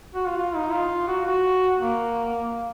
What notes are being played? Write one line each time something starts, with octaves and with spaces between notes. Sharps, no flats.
F#4
F4
F4
D#4
F4
F#4
F#4
A#3